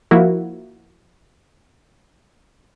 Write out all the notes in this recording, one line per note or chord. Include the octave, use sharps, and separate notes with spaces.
F3 A#3 E4 F#4